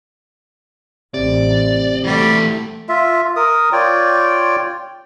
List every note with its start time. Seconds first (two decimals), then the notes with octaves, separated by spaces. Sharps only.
1.14 A1 C3 D5
2.04 E3 G3 A3 F#4
2.89 F4 E5
3.36 A#4 D#6
3.72 F4 C#5 D5 G5